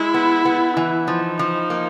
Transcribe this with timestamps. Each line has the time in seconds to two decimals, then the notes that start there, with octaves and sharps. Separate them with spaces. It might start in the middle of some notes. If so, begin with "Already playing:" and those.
Already playing: G#3 E4
0.14 B3
0.45 B3
0.77 E3
1.08 F3 D#4
1.39 F3
1.70 A#3